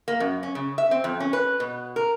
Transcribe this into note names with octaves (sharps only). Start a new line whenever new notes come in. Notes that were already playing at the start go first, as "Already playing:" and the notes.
A#3
F#2
C#4
C#3
E5
C4
F2
C#4
B4
B2
A#4